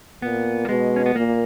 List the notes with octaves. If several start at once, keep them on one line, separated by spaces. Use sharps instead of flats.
A#2 B3
A#3
B2 G#3
C#4
B3
A#2 A#3